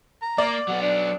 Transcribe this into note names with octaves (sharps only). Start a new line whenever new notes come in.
A#5
A#3 D5
F#3 B3 F#5
D4